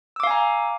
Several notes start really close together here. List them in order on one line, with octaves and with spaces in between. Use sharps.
E6 D6 F5 G#5 A#5